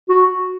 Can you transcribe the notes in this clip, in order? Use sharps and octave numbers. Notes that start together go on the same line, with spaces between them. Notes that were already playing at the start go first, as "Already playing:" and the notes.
F#4